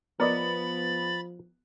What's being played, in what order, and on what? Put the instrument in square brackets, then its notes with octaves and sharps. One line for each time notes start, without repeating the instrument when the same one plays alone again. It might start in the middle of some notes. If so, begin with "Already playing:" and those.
[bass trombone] F3 [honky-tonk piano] B3 [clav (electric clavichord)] A#4 D5 D#5 [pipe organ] B5 A6